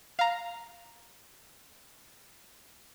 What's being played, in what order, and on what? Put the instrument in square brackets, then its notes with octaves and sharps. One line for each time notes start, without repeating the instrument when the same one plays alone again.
[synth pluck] F5 A#5